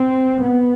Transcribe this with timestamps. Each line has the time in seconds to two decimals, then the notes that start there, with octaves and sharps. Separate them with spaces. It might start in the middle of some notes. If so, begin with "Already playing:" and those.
Already playing: C4
0.40 B3